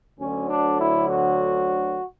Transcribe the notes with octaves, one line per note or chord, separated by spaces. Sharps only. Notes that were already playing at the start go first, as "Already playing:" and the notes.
D2 D3 F#3 C#4
D4
E4
F#4